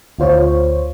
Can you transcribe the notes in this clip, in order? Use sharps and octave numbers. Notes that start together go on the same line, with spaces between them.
D2 F4 C5 C#5